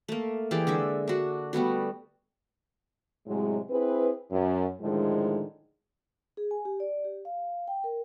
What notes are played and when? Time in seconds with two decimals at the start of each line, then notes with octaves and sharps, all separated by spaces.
0.08 A3 A#3
0.51 E3 G4 G#4 D5
0.67 D3 G#3 E5
1.07 D4 F#4
1.53 G3 A3 B3 F#4
3.27 A2 C3 F#3 G#3
3.70 C4 E4 G#4 B4
4.31 F#2
4.81 A2 D3 D#3 F3 G#3
6.37 G#4
6.51 G#5
6.65 G4
6.80 D5
7.05 G4
7.25 F5
7.68 G5
7.84 A#4